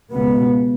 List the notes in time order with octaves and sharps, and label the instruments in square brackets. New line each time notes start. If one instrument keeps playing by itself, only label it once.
[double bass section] C#2 B2 B3